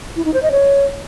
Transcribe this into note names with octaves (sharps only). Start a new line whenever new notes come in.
E4
D#4
C5
D#5
C#5